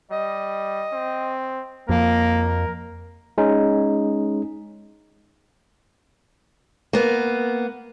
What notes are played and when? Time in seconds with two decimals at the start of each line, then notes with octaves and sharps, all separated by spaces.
0.11 G3 D#5
0.92 C4
1.89 F2 A#3 A#4
3.38 G#3 C#4 D#4
6.93 A#3 B3